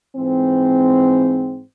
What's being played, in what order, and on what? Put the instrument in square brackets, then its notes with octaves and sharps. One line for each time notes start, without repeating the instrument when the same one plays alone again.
[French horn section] G#2 E3 C4